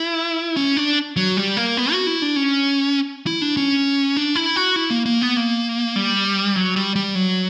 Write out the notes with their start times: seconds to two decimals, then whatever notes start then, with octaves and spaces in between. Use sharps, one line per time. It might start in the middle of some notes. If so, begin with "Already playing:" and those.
Already playing: E4
0.57 C#4
0.77 D4
1.16 F#3
1.37 G3
1.57 A#3
1.77 B3
1.92 F#4
2.07 E4
2.22 D4
2.36 C#4
3.26 E4
3.42 D4
3.57 C#4
4.17 D4
4.35 E4
4.56 F#4
4.76 E4
4.90 A#3
5.06 A#3
5.21 B3
5.36 A#3
5.96 G3
6.56 F#3
6.76 G3
6.96 G3
7.15 F#3